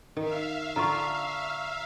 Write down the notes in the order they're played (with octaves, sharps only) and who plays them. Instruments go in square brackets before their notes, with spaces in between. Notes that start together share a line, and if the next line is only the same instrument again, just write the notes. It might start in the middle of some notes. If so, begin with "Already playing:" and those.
[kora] D#3 [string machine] E5 F5
[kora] D3 F4 [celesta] A#5 C#6